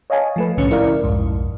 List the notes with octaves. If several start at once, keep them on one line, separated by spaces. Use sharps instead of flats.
C#5 D#5 F5 G#5 A5
F3 A3 B4
B1 A2 D3 C#4 C#7
E4 A#4 D5 F5
B1 F2 G#2